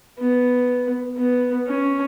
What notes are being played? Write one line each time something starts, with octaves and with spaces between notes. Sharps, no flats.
B3
B3
C#4